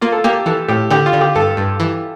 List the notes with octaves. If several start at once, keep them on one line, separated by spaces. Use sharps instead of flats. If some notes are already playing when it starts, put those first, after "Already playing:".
A#3 F4
A4
A#3 G4
E3 A4
A2 G4
D3 G4
F4
D3
G4
G2 A4
G2
E3